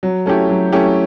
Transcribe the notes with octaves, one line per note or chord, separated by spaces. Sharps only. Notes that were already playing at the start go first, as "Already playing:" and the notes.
F#3
A3 C#4 E4 G4
F#3
A3 C#4 E4 G4